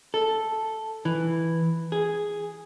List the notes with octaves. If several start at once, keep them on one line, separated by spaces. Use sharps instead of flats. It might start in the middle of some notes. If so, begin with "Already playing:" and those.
A4
E3
G#4